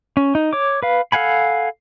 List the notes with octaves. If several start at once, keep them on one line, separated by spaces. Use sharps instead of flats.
C#4
D#4
C#5 D6
B4 F5
A4 F5 F#5 G#5 B5